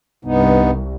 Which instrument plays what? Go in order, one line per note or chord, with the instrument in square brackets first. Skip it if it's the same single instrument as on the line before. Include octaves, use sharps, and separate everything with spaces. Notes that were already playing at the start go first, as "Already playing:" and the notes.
[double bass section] C2 [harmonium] G2 B3 D#4